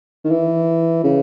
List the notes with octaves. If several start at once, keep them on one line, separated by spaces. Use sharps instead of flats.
D#3
E3
C#3